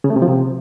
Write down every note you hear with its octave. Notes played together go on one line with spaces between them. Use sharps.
C#3
A3
C3
F3
C3